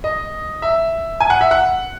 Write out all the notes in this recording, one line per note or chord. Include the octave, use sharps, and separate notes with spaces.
D#5
E5
G#5
F#5
E5
F#5